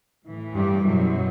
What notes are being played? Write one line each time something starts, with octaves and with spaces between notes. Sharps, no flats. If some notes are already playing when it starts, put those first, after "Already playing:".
A2 E3
G2 G3
F#2 B2 F#3